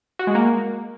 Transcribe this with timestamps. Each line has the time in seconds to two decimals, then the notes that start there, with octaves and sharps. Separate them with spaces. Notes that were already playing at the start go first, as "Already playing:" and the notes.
0.19 F#4
0.27 G#3
0.35 A#3